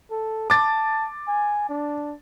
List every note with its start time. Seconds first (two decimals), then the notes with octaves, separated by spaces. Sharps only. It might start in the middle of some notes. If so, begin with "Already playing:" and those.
0.11 A4
0.50 A5 D6 A6
1.28 G#5
1.69 D4